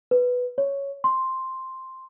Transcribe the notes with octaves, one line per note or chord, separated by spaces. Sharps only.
B4
C#5
C6